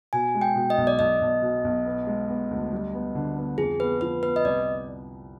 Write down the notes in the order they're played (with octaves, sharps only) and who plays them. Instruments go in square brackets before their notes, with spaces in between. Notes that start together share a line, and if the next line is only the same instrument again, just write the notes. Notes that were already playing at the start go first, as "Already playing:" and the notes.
[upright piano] B2 [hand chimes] G#5
[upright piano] G#3
[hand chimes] G5
[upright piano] B2
[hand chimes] D#5
[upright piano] B1
[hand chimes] D5
[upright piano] B1 [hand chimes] D#5
[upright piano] B1
B2
B1
B3
G#3
B3
D2
G3
B3
D3
B3
[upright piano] F2 [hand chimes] G#4
[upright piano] B3 [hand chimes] B4
[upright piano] F3 [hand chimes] B4
[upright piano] B3 [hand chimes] B4
[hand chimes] D#5
[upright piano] C2 [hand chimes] D5